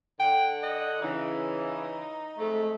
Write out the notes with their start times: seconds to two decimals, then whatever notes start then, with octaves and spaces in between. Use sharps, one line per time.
0.20 D3 F#5 G5
0.63 D#5
1.02 C#3 E3 D#4
2.38 F2 G#3 A3